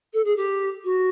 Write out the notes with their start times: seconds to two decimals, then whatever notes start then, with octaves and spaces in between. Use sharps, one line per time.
0.13 A4
0.25 G#4
0.36 G4
0.84 F#4